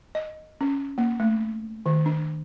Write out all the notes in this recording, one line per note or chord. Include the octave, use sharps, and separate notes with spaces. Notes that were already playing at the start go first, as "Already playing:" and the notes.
D#5
C#4
A#3
A3
D#3
D4